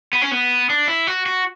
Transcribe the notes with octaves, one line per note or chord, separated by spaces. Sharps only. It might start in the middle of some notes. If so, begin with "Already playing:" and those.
B3
C#4
B3
D4
E4
F#4
F#4